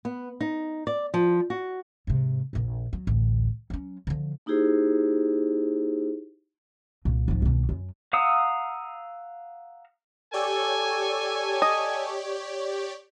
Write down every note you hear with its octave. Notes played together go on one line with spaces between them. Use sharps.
B3
D#4
D5
F3
F#4
G#2 C3
A#1 F2
F#3
A1 D2
F#3 C#4
D3 F3
A#3 D#4 E4 G4 G#4 C5
C2 A#2
G#2 F3
D#2 B2
F#2
F5 F#5 A#5 D#6 E6
G4 A4 C#5 D5 G#5
D#5